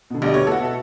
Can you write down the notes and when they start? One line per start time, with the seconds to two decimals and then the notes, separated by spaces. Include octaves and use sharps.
0.10 B2 D3
0.22 A#1 G3 D#5
0.34 A3 B3 C#5
0.47 A2 F#4 A4
0.60 B2 E5